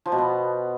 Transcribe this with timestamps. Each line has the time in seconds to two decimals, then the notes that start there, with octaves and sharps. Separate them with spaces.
0.06 F3
0.12 B2
0.18 B3